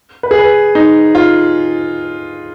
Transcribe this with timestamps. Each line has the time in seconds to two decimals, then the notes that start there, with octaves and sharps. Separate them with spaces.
0.23 B4
0.31 G#4
0.39 B4
0.75 D#4
1.15 F4